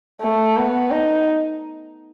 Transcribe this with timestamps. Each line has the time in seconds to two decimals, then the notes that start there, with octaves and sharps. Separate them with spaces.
0.22 A3
0.57 B3
0.91 D#4